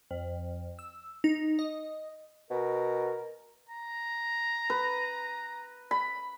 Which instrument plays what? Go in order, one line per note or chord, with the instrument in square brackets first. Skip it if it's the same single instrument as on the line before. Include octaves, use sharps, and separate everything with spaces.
[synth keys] F2
E6
D#4
D#5
[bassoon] B2 [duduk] A#4
[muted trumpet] A#5
[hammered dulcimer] B4
B5